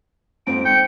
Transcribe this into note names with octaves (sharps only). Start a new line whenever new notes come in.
F2 G#2 C4 D7
G5 C#7